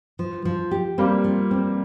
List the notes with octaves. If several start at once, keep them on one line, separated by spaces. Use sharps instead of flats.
F3
F3
G4
G3 A#3 C4
F3
C4